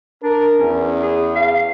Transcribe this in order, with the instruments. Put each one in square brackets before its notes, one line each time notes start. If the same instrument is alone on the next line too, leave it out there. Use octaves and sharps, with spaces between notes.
[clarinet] D4 [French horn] A#4
[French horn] E2 [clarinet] C#4
[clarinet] G#4
F5